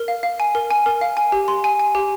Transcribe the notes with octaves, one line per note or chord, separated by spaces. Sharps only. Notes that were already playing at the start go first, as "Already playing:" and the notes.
Already playing: A#4
F5
F5
G#5
A#4
G#5
A#4
F5
G#5
G4
C6
G#5
G#5
G4